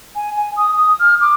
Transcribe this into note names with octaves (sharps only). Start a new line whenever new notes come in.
G#5
G#5
D#6
D#6
F6
D6